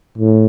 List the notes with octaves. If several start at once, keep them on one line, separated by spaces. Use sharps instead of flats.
A2